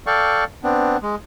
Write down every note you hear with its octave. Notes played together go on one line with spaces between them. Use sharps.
A4 D5 F5 G5 C#6
B3 C4 D4
G#3